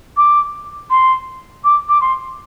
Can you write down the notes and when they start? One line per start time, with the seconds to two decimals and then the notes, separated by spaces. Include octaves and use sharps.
0.17 D6
0.90 C6
1.64 D6
1.89 D6
2.01 C6